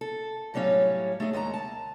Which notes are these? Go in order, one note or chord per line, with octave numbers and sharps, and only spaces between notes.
A4
A2 F#3 G3 C#4 C#5 F5
A3 D#4 G#4
D#2 G#3 E5 A#5
A5